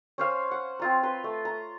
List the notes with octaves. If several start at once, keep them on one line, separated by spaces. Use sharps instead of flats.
C#4 C5 F5 G#5
F#5
C4 F4 A#5
B4 C6
A3
A#5